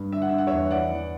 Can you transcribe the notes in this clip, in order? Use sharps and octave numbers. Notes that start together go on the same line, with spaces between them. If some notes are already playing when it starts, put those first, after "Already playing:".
Already playing: G2
D3 E5
F#5
D3 E5
F#5
E2 C#5 E5
E3 D5 F#5
E3